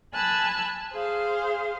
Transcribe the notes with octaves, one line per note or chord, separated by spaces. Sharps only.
G#5 A5 B5 E6 F#6
G#4 C5 F5